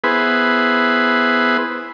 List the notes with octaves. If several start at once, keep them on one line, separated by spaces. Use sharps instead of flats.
B3 E4 G#4 B4 C5